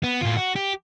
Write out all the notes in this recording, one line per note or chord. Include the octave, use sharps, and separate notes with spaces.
B3
A2 F4
F#4
G4